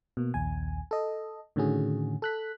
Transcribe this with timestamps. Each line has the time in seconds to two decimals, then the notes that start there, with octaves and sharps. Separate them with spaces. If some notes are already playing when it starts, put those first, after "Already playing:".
0.17 B2 A#3
0.34 A#1 D#2 G#5
0.91 A4 D#5
1.56 A2 D3 D#3 C#4 F#4 G#4
2.22 A4 F#6 B6